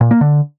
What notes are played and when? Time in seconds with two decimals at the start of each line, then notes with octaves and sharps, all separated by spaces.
0.01 A#2
0.11 A#3
0.21 D3